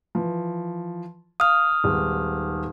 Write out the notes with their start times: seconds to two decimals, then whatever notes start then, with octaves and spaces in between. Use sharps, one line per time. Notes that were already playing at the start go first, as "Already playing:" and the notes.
0.15 E3 F3
1.40 F5 D#6 F6
1.84 D#1 G#3 B3